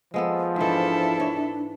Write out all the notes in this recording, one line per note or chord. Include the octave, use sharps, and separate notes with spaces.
F3 G#3 B3 A4
G#2 E3 D4 E4 A4
C#5